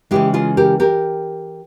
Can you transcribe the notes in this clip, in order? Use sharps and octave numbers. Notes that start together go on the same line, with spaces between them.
C#3 E3 G#3 E4 G4
F4 G#4
G4 A#4
G4 A#4